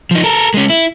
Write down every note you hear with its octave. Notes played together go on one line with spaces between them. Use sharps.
F3 D#4
A4 A#4
G#3 C#4
E4